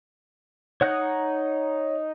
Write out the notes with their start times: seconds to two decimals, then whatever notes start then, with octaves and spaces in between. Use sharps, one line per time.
0.81 D#4 C#5 F#5 F#6